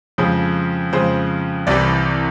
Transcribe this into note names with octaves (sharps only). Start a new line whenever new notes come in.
F2 C#3 F3 G#3
F2 C#3 F3 G#3 C5
C2 C3 E3 D5